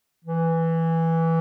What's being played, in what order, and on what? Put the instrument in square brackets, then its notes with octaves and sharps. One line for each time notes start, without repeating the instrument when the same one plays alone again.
[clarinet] E3